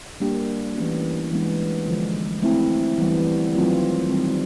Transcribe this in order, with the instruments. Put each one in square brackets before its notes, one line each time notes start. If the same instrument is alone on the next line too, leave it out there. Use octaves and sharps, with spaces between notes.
[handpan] G3 A#3 D4 G4
E3 A3 C#4 F#4
E3 G#3 B3 D4
D3 F3 G#3
A3 C4 E4
E3 G3 B3
D#3 F#3 A3 C4 F4
D#3 G3 C4